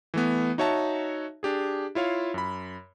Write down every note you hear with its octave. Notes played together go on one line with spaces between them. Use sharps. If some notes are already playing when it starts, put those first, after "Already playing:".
E3 A3 B3
D#4 F#4 C#5 E5 A5
D4 G4 G#4
E4 F4 C#5 F5
F#2 B5